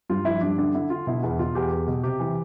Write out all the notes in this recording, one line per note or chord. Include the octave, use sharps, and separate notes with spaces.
G2 F4
F3 E4
G2 D4
D3 D4
D3 E4
D3 F4
B2 E4
E2 E4
B2 F4
E2 G4
E2
B2
C3 G4
E3